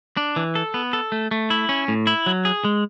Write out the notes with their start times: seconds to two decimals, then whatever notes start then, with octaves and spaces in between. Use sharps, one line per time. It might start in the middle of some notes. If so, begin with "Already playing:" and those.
0.17 D4
0.36 E3
0.55 A4
0.74 B3
0.93 A4
1.12 A3
1.31 A3
1.50 E4
1.69 C#4
1.88 A2
2.07 E4
2.26 F#3
2.45 G#4
2.65 G#3